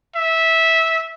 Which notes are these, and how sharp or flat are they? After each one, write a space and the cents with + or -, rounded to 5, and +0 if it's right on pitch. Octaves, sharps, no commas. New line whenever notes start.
E5 -15